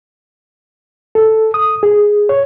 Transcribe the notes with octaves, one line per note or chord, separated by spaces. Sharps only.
A4
D#6
G#4
C#5